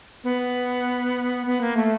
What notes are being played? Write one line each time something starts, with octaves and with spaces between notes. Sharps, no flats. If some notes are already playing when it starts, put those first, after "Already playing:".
B3
B3
A#3
A3